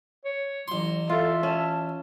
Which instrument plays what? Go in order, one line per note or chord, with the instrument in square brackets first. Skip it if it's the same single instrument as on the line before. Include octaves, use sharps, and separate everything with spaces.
[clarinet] C#5
[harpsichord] A1 C6 [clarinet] F#3
[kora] F4 [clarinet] A4 [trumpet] E5
[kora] C#4 [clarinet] A5